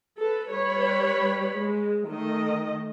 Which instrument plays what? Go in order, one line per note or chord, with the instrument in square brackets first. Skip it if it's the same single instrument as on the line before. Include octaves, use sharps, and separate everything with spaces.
[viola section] A4 B4
G3 B4 C#5 B5
G#3
D#3 A3 D#5